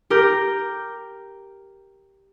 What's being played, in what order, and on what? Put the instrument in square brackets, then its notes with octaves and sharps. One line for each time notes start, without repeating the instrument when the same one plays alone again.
[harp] G4 A#4 G6